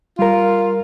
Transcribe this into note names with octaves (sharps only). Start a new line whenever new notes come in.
G3 F4 A#4